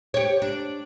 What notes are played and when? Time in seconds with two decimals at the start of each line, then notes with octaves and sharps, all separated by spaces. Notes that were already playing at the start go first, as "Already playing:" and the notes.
0.14 G4 C#5
0.42 D4